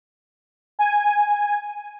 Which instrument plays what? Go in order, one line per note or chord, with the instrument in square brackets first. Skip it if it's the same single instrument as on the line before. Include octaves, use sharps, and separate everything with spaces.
[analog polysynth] G#5